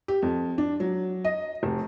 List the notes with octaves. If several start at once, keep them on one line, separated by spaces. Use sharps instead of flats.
G4
F2
D4
F#3
D#5
F1